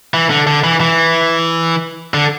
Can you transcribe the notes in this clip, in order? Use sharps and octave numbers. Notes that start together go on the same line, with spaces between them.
E3
D3
D3
E3
E3
D3